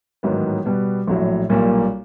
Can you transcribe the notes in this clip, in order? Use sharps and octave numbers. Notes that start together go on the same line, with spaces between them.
A1 G#2 D#3 F#3 B3
B2 G3 B3
A#1 A2 F#3
B1 A#2 G3 A#3